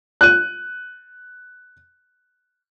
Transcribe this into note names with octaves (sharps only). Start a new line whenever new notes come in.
F#6 D#7